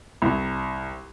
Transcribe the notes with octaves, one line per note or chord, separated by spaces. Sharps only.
C2